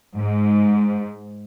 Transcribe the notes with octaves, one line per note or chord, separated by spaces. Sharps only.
G#2